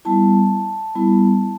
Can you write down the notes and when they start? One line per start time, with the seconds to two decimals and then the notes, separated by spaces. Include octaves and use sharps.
0.05 G3 B3 E4 A5
0.95 G3 B3 E4